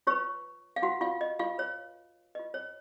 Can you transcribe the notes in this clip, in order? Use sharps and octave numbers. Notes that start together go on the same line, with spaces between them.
F4 B4 C#5 C#6
F5
F4 F#4 B4 F#5
F4 F5
D#5
F4 F5
F4 B4 C#5
F4 B4 D#5
C#5